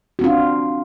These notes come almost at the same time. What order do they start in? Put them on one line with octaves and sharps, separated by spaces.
F#4 C4 F4 D4